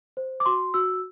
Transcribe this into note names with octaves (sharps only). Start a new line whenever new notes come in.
C5
D6
F#4 C6
F#4 E6